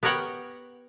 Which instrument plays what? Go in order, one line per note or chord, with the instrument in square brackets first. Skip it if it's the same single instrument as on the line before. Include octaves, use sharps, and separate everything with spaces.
[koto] B3 G4 A#4 C#5 F#5 G5